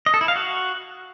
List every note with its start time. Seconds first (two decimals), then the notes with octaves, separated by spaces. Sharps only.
0.06 D#5
0.14 A4
0.21 E4
0.28 F5
0.36 F#4